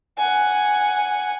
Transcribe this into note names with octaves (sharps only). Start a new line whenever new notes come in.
F#5 G#5